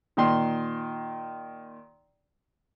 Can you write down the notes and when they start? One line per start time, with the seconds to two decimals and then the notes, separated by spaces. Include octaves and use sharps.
0.17 A#2 D#3 C6